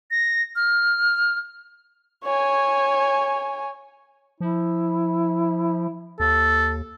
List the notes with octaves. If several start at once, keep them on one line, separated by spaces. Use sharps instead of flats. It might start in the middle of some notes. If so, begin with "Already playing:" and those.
A#6
F6
C#5 G#5
F3 E4
D#2 A4